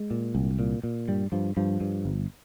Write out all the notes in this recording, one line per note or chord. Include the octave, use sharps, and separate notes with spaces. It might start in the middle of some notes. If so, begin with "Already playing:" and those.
Already playing: G#3
A#2
C2
A#2
A#2
G2 G3
G2 F3
G2 F3
G2
G1